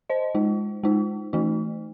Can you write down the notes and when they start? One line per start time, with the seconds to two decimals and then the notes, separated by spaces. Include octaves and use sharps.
0.10 C5 D#5
0.35 G#3 D#4
0.83 G#3 D#4
1.33 E3 A3 D#4